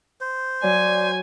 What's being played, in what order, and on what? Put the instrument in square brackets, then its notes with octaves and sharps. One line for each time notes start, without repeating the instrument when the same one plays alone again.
[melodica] C5
[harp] F#3 [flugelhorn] D5 [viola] G#5